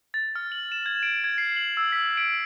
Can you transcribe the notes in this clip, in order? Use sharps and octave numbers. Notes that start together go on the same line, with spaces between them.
A6
F6
F#7
E7
G#6
D7
G#6
C7
F#7
E6
B6
D7